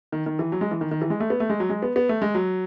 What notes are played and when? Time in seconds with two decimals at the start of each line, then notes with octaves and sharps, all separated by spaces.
0.12 D#3
0.26 D#3
0.39 E3
0.52 F#3
0.61 G#3
0.71 E3
0.81 D#3
0.91 D#3
1.02 E3
1.10 G#3
1.20 A3
1.30 B3
1.40 A3
1.50 G#3
1.60 F#3
1.70 G#3
1.83 B3
1.96 B3
2.09 A3
2.22 G#3
2.35 F#3